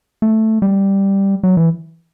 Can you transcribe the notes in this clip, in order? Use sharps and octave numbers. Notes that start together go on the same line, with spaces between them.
A3
G3
F#3
E3